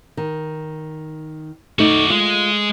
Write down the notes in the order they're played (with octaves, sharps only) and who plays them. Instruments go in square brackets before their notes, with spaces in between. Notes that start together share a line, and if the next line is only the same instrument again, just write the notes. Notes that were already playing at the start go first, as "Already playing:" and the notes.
[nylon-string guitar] D#3
[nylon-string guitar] A3 D#4 [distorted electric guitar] F#4 D5
[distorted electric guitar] G#3 [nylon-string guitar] F4